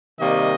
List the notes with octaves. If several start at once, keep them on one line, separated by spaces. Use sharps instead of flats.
C3 D#3 G3 A#3 D#5